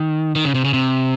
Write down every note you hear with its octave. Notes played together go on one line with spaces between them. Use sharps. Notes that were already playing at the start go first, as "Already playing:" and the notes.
Already playing: D#3
D#3
C#3
C3
C#3
C3